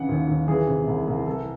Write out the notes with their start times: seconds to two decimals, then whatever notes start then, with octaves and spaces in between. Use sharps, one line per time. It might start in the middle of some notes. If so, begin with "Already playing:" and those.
Already playing: C#3 E3 F#5
0.09 D#2
0.28 D#2
0.48 E3 G#4
0.68 C3
0.87 C2
1.07 C2
1.26 E3 A4